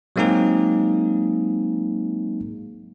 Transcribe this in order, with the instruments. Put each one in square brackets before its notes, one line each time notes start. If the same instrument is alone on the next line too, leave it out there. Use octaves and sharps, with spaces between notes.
[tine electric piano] F#3 G#3 A#3 C4 D#4 G#4